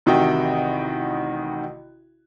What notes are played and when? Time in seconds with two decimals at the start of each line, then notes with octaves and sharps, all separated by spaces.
0.06 A1 C3 D#3 D#4 F#4 G5